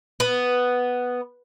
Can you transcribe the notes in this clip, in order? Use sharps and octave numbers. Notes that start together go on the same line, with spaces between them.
B3